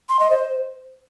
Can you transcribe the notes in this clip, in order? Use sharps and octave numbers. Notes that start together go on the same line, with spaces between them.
C6
D#5
C5